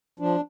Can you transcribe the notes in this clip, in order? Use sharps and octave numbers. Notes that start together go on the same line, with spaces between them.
F3 D4